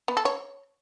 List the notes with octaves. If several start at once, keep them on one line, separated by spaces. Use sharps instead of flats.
B3
A4
C#5